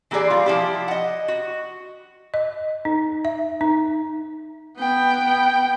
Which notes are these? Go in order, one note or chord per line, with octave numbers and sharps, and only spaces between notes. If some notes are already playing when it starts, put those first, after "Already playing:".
E3 A#3 G4 G#4 D5
G3 F4
F3 E4 G4
D#5 F#5
F#4
D#5
D#4
E5
D#4
B3 G5